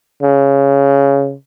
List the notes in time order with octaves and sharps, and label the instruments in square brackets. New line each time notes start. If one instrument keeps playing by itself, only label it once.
[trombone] C#3